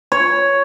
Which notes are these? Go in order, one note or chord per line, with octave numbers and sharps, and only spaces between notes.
C#5